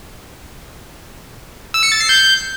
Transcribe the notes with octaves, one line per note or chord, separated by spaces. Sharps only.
E6
C#7
A6
C7
G6